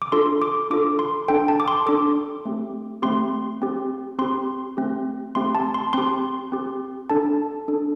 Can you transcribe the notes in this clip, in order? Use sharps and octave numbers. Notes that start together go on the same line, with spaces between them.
D6
D4 F4 A4 C6
D6
D4 F4 A4 D6
C6
D4 A4 G5
A5
D6
C6
D4 A4 D6
A3 C4 G4
A3 C4 G4 C6
C4 G4
C4 G4 C6
A3 C4 G4
A3 C4 G4 C6
A5
C6
C4 G4 C6
C4 G4
D4 A4 A5
D4 A4